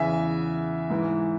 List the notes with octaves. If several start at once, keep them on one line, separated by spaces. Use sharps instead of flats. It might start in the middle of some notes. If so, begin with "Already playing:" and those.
Already playing: E2 C#3 E3 E5 G#5
G#2 E3